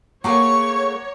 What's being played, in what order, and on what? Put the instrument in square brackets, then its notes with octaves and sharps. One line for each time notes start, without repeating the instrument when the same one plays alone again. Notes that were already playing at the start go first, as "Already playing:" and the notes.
[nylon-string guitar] A3 A#3 G#4 [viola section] C#5 [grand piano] F#5 A#5 D6 [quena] C#6